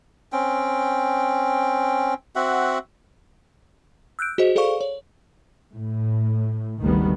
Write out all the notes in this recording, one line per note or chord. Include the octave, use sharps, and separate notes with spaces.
C4 C#4 G5
C4 F#4 E5 F#5
E6 F#6 G6 D7
F#4 G#4 C5 D#5
G#4 A4 C5 D5 F5 C#6
C#5
A2
F#1 D2 D#3 G3 B3